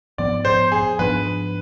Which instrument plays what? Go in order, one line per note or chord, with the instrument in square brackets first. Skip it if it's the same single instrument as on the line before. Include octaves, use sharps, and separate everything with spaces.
[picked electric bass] G#2 F3 B3 [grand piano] D5
[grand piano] C5
G#4
[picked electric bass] G#2 F3 B3 D4 [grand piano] B4